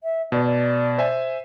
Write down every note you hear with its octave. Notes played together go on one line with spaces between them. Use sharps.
E5
B2 D5
D5
C5 E5 G#5